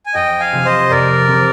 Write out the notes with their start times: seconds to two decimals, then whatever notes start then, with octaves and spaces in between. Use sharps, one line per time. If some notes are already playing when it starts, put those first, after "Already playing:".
0.06 G#5
0.14 F2 D#5 G5
0.40 F5 G#5
0.52 C3 F3 C4 G4
0.65 C5 D#5
0.90 F2 A#4 D5
1.28 C3 F3 C4 G4